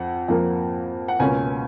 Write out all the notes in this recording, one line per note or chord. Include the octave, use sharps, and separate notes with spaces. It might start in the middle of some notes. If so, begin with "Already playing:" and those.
Already playing: F2 F#5
F2 F3 A#3
F#5
C#2 B2 A#3 C#4 G#5